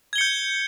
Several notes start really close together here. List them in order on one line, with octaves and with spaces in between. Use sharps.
G#6 G7 C#7 G6